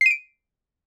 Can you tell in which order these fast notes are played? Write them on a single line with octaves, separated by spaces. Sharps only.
C7 D#7 D7